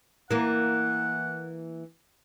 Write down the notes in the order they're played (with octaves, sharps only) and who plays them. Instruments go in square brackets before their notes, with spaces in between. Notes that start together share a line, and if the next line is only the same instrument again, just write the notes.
[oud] E3 A#3 [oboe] F#5